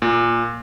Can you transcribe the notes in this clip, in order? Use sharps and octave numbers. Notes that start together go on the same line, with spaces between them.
A#2